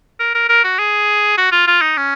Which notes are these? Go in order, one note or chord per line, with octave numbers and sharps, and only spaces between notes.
A#4
A#4
A#4
F#4
G#4
F#4
F4
F4
D#4
C#4